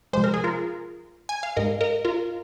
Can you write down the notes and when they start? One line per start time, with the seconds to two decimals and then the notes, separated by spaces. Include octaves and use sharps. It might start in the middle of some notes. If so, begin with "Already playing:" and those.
0.13 C3 F3 G#3 C5
0.24 A#4
0.34 G#4
0.44 F4 A#4
1.29 G#5
1.43 F5
1.57 G#2 G#3 A#4 D#5
1.81 A#4 D#5
2.05 F4 A#4